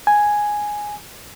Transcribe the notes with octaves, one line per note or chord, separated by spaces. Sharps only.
G#5